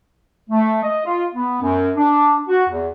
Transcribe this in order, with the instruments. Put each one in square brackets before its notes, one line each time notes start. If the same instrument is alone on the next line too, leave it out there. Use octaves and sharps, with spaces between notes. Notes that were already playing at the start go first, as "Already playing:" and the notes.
[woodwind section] A3
D#5
F4
B3
F#2
D4
F#4
E2